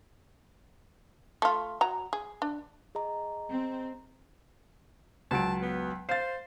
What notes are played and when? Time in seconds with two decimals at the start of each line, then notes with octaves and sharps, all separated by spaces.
1.42 A3 F4
1.81 F#3 A#5
2.13 G#4
2.42 D4
2.95 G#4 D#5 A#5
3.49 C4
5.31 C#2 F#3 A5 D7
5.63 B3
6.09 C5 F5 A6